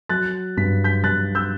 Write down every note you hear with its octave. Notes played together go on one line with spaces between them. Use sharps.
F#3 F#6 A6
G2 B6
G6 B6
G2 F#6 A6
E6 G6